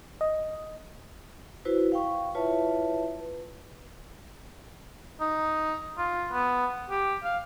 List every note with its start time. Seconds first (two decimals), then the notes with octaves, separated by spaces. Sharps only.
0.21 D#5
1.65 E4 F#4 B4 C5
1.92 F5 G5 C#6
2.35 E4 F4 B4 C#5 E5 A5
3.20 B4
5.20 D#4
5.98 F4
6.32 B3
6.90 G4
7.24 F5